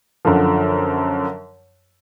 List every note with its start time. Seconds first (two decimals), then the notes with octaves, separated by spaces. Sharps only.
0.25 F#2 D3 F3